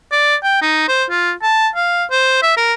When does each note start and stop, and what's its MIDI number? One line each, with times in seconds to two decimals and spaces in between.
0.12 0.36 74
0.43 0.59 79
0.62 0.85 63
0.88 1.04 72
1.10 1.32 65
1.42 1.68 81
1.75 2.05 77
2.11 2.41 72
2.43 2.54 76
2.57 2.74 70